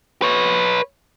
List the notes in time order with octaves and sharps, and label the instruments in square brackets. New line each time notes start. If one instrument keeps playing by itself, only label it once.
[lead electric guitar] B4 C#5